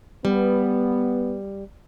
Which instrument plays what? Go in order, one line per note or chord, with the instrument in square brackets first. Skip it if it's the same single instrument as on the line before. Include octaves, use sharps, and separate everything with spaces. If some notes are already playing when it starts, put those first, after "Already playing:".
[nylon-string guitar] G3 [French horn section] B3